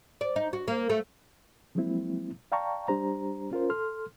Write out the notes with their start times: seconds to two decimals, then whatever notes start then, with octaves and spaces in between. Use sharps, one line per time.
0.21 D5
0.36 D#4
0.53 F#4
0.68 A#3
0.89 A3
1.75 F3 F#3 G#3 A#3 C4 E4
2.52 D5 F5 G5 A5 A#5 C#6
2.88 G3 D4 G4 C5 A#5
3.51 C#4 F4 A#4 C5
3.69 A4 C6 F6